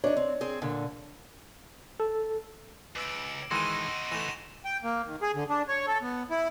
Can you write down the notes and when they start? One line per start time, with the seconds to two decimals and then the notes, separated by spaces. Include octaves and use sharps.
0.04 D4 D#4 C#5
0.17 C4
0.41 C4 G#4 C5
0.62 A#2 D3
2.00 A4
2.96 C#2 B4 D6 E6 D7
3.51 D#3 E3 G#3 D#4 F#4 C6 A#6 D#7
4.12 E3 A3 A#6 E7 F7
4.65 G5
4.84 A#3
5.06 D#3
5.22 G#4
5.34 D3
5.49 D4
5.68 C#5
5.87 A4
6.02 B3
6.30 E4